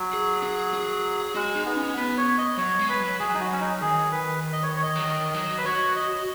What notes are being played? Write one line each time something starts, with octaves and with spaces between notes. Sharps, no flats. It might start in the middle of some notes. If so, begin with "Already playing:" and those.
Already playing: F#3
G#4
G#4
G#4
G#3 F#4
D#4
B3
C#4
B3 B4
C#5
D#5
F#3 C#5
G#3
B4
F#3
F#3 G#4
D#4
F#4
F#3 C#4
D#4
D#3 G#4
B4
D#5
C#5
C#5
D#5
F#3
D#3
F#3
B4
F#4 C#5
D#5